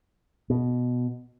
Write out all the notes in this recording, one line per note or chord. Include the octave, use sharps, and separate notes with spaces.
B2